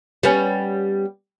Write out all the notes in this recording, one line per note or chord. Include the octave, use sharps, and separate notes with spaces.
G3 B3 C#4